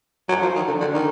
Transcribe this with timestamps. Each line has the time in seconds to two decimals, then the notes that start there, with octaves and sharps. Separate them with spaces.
0.29 F#3
0.42 F3
0.55 D#3
0.67 D3
0.81 D3
0.94 D#3